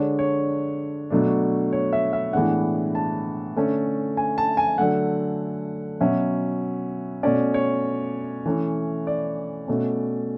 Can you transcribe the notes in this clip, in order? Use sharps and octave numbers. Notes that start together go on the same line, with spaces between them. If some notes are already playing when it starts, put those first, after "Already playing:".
Already playing: D3 G#3 D4 C#5
C#5
B2 F#3 A3 D4
C#5
E5
E5
A2 E3 G#3 B3 D4 F#5
A5
D3 A3 C#4
G#5
A5
G#5
D3 F#3 A3 F#5
B2 F#3 C#4 E5
B2 A3 C#4 D5
C#5
E3 A3 C#4
D5
B2 A3 C#4